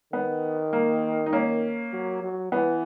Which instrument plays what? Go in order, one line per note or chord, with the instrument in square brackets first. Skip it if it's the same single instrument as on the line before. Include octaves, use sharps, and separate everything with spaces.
[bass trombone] D#3 [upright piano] B3
[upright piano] A#3
D#4
A#3 C#4
[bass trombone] F#3
F#3
[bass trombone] E3 [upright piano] B3